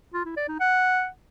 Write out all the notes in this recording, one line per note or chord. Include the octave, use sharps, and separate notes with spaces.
F4
E4
D5
D#4
F#5